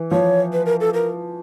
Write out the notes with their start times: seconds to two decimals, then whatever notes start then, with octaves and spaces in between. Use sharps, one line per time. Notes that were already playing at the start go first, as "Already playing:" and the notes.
Already playing: E3
0.11 F3 C#5
0.53 B4
0.66 A#4
0.81 A4
0.94 A#4